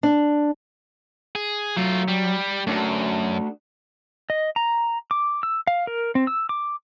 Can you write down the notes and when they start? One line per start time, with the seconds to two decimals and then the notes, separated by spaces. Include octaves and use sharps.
0.03 D4
1.35 G#4
1.77 F#3 A3 F4
2.08 G3
2.67 F#2 A3 D4 F#4
4.30 D#5
4.56 A#5
5.11 D6
5.43 E6
5.67 F5
5.87 A#4
6.15 C4
6.27 E6
6.49 D6